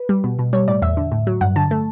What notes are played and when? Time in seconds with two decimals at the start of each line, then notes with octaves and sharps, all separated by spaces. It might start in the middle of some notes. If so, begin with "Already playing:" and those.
Already playing: B4
0.09 G3
0.24 B2
0.39 B2
0.53 G3 C#5
0.68 A2 D5
0.82 E2 E5
0.97 D3
1.12 A2
1.27 F#3
1.41 G2 F#5
1.56 D3 A5
1.71 A3